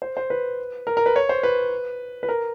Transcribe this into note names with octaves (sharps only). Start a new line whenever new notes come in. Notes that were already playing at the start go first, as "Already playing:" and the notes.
C5
C5
B4
A#4
A#4
B4
C#5
C5
B4
B4
A#4